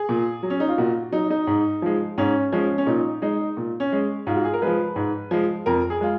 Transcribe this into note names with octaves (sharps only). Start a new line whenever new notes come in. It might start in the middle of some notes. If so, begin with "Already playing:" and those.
Already playing: G#4
A#2
F#3
C#4
D#4
F4
A#2 F#4
F#3 D#4
D#4
G#2
F3 G#3
G#2 C#4
F3 G#3 C#4
C#4
A#2 D#4
G#3 D#4
A#2
C#4
G#3
G#2 F4
F#4
G#4
A#4
F3 G#3 B4
G#2
F3 G#3
F2 A#4
G#4
G#3 F4